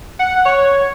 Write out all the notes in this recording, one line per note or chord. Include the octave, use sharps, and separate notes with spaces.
F#5
C#5